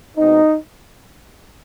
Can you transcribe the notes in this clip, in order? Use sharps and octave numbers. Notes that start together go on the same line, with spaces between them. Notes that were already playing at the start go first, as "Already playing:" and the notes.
B2 G#3 C4 D#4